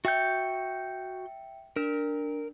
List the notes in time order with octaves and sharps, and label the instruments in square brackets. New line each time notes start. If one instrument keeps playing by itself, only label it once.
[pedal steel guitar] F#4 G6 [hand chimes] E5 G5 C#7
[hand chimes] D4 [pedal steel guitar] A#4